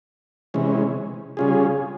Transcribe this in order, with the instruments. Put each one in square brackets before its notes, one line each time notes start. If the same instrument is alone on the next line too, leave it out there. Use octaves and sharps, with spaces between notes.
[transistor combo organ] C3 E3 G#3 C#4
C#3 G3 C#4 F4 G#4